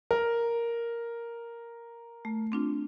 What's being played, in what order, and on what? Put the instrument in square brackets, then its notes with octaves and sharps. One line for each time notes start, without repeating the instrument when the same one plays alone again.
[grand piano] A#4
[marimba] A3
C4 D4 F4